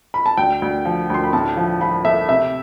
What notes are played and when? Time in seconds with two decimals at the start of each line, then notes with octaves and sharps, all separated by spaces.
0.14 B5
0.26 A5
0.37 D2 G5
0.62 D2
0.85 F3
1.10 D2 C6
1.24 B5
1.33 A2 A5
1.57 F3
1.81 F3 B5
2.05 A3 E5
2.29 C3 E5